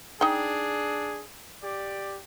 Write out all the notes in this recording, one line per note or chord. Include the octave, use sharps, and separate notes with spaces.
D4 D#4 G#4 G5
G4 D5